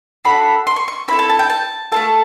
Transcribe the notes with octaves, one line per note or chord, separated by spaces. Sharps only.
D4 F#4 A4 B5
C6
C#6
C#6
C4 E4 A4 B5
A5
A5
G5
A5
A3 C4 F4 A4 A5